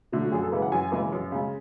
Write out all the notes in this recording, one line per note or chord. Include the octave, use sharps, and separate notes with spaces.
D3 F#3 A3
F#4
F#2 G#4
A4
C#3 E3 G#3 B4
F#5
F#2 G#5
C#3 E3 G#3
F#2
C#3 G#3